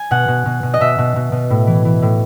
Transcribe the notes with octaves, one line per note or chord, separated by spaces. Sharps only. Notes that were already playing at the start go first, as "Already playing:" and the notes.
Already playing: G#5
B2 F#5
B2
B2
B2
D#5
B2 E5
B2
B2
B2
A2
E3
E3
A2